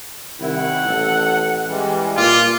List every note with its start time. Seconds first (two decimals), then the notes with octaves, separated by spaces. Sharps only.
0.40 C2 D#3 E4 F#5
0.85 A1 A4
1.68 E3 G3 G#3
2.17 A#2 F4 D6